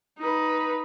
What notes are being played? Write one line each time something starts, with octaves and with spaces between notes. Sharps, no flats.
D#4 B4